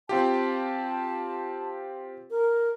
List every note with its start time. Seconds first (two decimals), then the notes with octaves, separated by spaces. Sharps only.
0.09 C4 F4 G4 A5
2.30 A#4